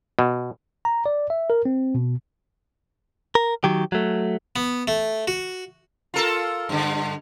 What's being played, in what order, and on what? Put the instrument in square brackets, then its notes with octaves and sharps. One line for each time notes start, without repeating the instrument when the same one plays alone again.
[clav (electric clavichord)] B2
[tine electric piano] A#5
D5
E5
A#4
C4
B2
[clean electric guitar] A#4
D#3 F#3 G4
F#3 A3
[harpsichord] B3
A3
F#4
[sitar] F4 A4 A#4
G2 D3